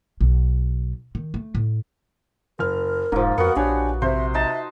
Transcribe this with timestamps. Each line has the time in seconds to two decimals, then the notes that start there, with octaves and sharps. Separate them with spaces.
0.21 B1
1.15 D#3
1.34 A3
1.55 A2
2.59 F#1 A#4 F6
3.12 E1 G#2 F3 A#3
3.38 F2 B3 F#4 A#4 C#7
3.56 A#1 D4 G4 C#5 G#5
4.02 C3 C5 E5
4.34 D#4 D#5 E5 A5